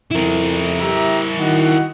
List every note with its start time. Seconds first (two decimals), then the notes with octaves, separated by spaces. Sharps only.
0.12 F2 E4 A#4
0.79 G4 E5 A#5
1.38 D#3 F#4 D#5 F#5